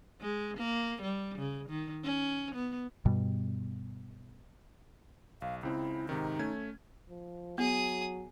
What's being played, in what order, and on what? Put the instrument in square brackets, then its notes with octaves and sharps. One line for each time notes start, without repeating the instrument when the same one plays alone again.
[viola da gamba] G#3
A#3
G3
C#3
D#3
C#4
B3
[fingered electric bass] G2 B2 G3
[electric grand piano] B1 [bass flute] F5
[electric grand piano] C#2 C#3 C4 [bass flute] E4
[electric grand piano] G#2 C3 D#3 [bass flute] D#4
[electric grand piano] A3 C#4 G#6
[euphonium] F3
[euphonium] F#3 [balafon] B3 [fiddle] G#4 D#6